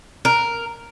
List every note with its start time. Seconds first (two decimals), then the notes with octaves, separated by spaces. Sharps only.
0.25 A#4